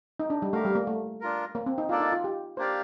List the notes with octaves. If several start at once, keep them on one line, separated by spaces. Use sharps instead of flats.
D#4
D4
G3
A3 G4 A#4 F5
G3
A#3
A3
D4 F4 A#4
A#3
C4
D#4
A#3 D4 F4 A4 D5
D#4
F4
G4
A#3 D4 G4 C5 D5 F5